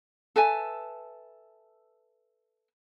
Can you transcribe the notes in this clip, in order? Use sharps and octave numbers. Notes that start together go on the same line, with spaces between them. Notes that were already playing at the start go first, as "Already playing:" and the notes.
A4 B4 E5 G#5